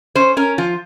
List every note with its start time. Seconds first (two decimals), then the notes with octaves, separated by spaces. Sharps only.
0.15 C#4 C5
0.37 C#4 A#4
0.58 F3 F4